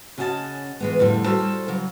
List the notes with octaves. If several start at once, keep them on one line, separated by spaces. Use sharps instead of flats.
C#3 C#4 F#4 D#5 E5 A5
E3 G#3 B3
F2 A2 D3 G3
G3 F#4 A4 C5 A5
C#3 F#3